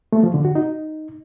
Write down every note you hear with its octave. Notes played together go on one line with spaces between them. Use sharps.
A3
F3
D3
F#4
D#4